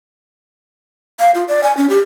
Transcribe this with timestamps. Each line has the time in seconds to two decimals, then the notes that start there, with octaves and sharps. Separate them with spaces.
1.19 F5
1.35 F4
1.48 D5
1.63 G#5
1.77 C#4
1.90 G4